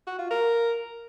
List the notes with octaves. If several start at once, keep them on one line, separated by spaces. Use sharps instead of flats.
F#4
F4
A#4